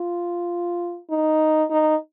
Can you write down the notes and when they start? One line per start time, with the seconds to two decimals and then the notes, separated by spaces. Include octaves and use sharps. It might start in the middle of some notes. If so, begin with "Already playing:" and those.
Already playing: F4
1.10 D#4
1.70 D#4